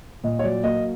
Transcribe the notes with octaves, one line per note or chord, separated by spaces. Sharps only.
A#2 D#5
C#5
F#3 D5
A#3 D#5